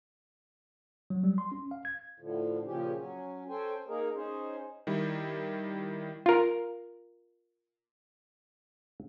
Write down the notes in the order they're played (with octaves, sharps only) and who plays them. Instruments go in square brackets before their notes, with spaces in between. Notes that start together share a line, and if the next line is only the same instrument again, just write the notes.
[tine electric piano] F#3
G3
C6
C#4
F5
G#6
[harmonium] A2 D3 F3
A#2 C#3 F3 C#4 G4
F#3 C#4
C#4 A4 C5 G5 G#5
A#3 D#4 G#4 A#4
C#4 D#4 G#4 C5
[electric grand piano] D#3 G3 E4
[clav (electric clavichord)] F4 A#4